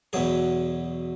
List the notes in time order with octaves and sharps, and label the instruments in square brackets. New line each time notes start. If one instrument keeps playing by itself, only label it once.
[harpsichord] E2 B2 F#3 G#4